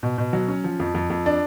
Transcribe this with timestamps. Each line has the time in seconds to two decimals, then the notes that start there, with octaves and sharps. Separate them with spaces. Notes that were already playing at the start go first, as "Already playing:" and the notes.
0.03 B2
0.18 B2
0.33 F#3
0.48 C#4
0.64 F3
0.80 F2
0.95 F2
1.10 F2
1.26 D4